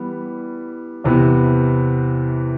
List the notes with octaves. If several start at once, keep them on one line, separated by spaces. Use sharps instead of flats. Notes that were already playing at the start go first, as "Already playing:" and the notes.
Already playing: E3 G3 B3
E2 C3 E3 B3